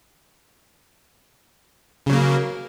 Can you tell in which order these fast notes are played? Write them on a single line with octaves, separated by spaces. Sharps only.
C#3 F#3 A#3